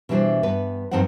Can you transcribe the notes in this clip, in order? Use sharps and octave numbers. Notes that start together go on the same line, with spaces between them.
B2 E3 G3 D4 E4 C5
G2 B3 B4
G2 F3 C4 D#4 C5 F#5